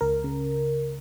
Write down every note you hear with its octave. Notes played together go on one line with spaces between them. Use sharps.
C#2 A#4
C#3